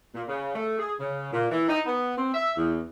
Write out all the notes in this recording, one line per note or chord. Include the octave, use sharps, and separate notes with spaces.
A#2
C#3
A3
G#4
C#3
A#2
E3
D#4
B3
C4
E5
E2